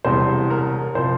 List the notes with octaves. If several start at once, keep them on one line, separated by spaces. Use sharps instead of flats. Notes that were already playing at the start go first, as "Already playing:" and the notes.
E1 E2 C3 G3 C5
A#4
C3 F3 C5